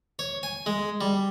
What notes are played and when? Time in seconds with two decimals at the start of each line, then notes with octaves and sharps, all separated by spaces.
0.19 C#5
0.43 G#5
0.66 G#3
1.01 G3